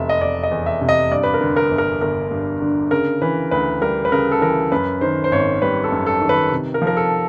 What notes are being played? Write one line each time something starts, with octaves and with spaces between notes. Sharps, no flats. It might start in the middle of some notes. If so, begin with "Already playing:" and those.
Already playing: F1 E2 C3 E5
D#5
F1 D5
D#5
E2
E5
C3
D#5
G2 D5
B4
A#4
D3
A#4
G1
A#4
G1 A#4
G2
D3
C#3 A#4
E3 B4
D2 B4
G3 A#4
B4
C#3 A#4
A4
E3 A#4
F#2 B4
D#3 C5
C5
G#1 C#5
G3 B4
A4
F#2
A4
D#3
B4
C3
A#4
F3
A#4
A4